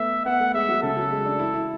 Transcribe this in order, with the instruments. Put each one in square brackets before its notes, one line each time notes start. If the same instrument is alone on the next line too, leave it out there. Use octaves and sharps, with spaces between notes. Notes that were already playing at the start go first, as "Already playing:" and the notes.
Already playing: [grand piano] A3 B3 [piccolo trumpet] E5
[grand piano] B3 [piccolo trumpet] F#5
[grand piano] A3
[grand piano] G#3 [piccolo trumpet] E5
[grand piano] F#3
[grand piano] C#3 [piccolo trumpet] A4
[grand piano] F#3
G#3
D4
E4
E4